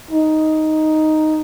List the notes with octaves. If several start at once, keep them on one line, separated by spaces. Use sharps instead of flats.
D#4